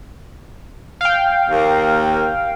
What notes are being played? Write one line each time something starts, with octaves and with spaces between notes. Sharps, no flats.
F5 G5
D#2 A#3